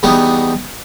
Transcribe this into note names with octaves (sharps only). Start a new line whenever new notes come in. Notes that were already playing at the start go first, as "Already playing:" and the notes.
E2 G3 B3 D#4 C#5